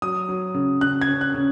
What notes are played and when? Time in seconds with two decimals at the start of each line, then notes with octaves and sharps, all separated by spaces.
0.02 F#3 D#6
0.29 F#3
0.54 C#3
0.81 C#3 F#6
1.01 G#6
1.08 C#4
1.21 F#6
1.34 C#3